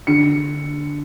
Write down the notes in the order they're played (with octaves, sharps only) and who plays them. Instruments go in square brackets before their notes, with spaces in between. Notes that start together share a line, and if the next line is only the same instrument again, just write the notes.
[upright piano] D3 C#7